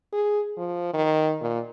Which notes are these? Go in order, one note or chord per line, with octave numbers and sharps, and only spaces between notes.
G#4
F3
D#3
A#2